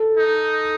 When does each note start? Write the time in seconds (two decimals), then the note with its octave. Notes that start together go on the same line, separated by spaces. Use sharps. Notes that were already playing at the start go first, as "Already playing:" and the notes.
Already playing: A4
0.17 D#4